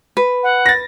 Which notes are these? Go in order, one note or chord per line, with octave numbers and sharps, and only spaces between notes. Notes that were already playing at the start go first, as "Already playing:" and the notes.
B4
F#5
A6 A#6